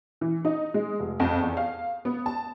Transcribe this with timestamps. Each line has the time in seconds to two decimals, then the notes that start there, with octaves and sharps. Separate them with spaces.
0.21 E3
0.45 D#4
0.74 G#3
1.00 F1
1.20 F2
1.41 E2
1.57 F5
2.05 B3
2.26 A5